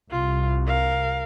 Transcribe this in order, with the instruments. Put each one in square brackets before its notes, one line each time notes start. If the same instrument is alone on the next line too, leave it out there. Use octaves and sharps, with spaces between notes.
[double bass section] C2 [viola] F4
[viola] A#4 F5